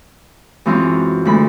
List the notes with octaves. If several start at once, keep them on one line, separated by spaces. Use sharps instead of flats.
F#2 E3 G#3 C4 F4
D2 G#3 B5